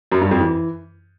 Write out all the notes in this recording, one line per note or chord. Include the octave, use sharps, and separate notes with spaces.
F#2
G2
F2
E3